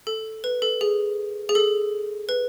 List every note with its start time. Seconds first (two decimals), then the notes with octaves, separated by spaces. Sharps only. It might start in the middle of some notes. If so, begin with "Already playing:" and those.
0.07 A4
0.44 B4
0.62 A4
0.81 G#4
1.49 G#4
1.55 A4
2.29 B4